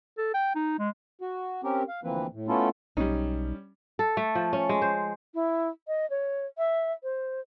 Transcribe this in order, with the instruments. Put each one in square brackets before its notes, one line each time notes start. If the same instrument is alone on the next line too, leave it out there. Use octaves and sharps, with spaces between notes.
[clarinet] A4
G5
D#4
G#3
[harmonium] F#4
C4 C#4 G4 A#4
F5
D2 E3 F3 A#3 C4 B4
A2
A3 B3 C#4 E4 F4 A4
[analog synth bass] B1 [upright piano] G3 C#4 [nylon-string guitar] D#4
[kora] A4
A3
F3
C#4
G#3
C5
[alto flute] E4
D#5
C#5
E5
C5